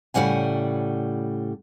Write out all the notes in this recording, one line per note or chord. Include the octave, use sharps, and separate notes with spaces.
A2 C#3 G3 F#5 G#5